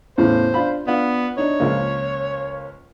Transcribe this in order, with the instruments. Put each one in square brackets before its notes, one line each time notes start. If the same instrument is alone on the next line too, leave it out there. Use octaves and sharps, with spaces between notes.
[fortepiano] E2 A2 C#3 [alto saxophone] C5
[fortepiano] D4 F4 B5
[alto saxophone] B3 [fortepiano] D4 F4
[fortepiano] D4 D#4 [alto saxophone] C#5
[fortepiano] C#2 F3 A#3